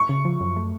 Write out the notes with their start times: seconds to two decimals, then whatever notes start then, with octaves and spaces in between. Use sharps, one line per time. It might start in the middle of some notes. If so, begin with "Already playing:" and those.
Already playing: C#6
0.09 C#3
0.25 F3
0.41 F#2
0.56 A3